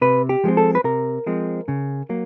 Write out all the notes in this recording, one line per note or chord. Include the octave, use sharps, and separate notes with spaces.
C3 B4
G4
F3 G#3 C4
A4
B4
C3 A#4
F3 G#3 C4
C#3
F#3 A#3